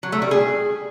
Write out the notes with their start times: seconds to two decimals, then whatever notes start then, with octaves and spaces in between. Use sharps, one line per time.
0.03 F#3
0.12 A3
0.22 G3
0.31 G#4